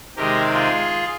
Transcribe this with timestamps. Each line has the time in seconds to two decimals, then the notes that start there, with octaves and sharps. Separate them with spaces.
0.16 C3 D#3 G#3 G4 A#4
0.53 F4 G#4